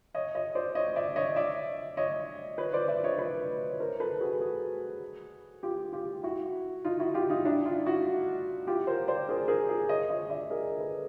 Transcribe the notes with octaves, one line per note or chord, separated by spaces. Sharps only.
C#5 D#5
C#5 D#5
C5 D5
C#5 D#5
D5 E5
C#5 D#5
D5 E5
C#5 D#5
B4 C#5
C5 D5
D5 E5
C#5 D#5
B4 C#5
C#5
A#4 C5
A4 B4
F#4 G#4
F#4 G#4
F4 G4
F4 G4
E4 F#4
D#4 F4
E4 F#4
F4 G4
D#4 F4
D4 E4
D#4 F4
E4 F#4
F4 G4
A#4 C5
C5 D5
G#4 A#4
G#4 A#4
G#4 A#4
C#5 D#5
C#5 D#5
D5 E5
G#4 A#4
A4 B4